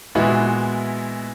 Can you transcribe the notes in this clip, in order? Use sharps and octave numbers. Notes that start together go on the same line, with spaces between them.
A#2 E3 G#3 B3 E4 F#4